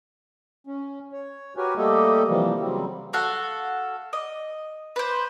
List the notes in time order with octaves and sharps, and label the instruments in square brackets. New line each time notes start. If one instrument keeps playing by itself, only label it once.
[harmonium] C#4
C#5
F#4 G4 A#4 B4 C#5 G#5
G3 A3 A#3 G4 A4 D#5
C3 E3 F3 G3 A#3
C#3 F#3 G3 C4
[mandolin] F#4 A4 F5 F#5
D#5
B4 C5